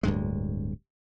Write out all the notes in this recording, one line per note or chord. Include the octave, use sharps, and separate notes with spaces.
D1 D2 G2 G#3